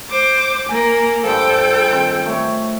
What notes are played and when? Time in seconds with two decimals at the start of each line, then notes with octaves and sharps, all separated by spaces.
0.10 C5 D6
0.69 A#3 A#4 G#5
1.24 G2 F3 A4 G5
1.89 D#3 C4
2.26 A3 C#5